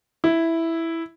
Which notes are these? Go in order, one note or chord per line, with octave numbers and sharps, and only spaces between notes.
E4